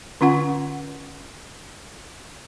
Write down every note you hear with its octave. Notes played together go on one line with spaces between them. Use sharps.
D3 C#4 F4 F#5